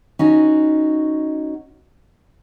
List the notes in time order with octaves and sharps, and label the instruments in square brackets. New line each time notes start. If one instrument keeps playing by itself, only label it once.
[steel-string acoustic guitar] C#4 D#4 F#4